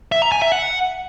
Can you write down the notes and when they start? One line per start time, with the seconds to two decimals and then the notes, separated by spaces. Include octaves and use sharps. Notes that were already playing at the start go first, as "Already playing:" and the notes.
0.12 E5
0.22 A#5
0.32 G#5
0.42 E5
0.52 F#5